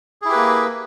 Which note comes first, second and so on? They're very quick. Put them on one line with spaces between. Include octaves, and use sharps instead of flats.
G#4 E4 G4 B4 A#3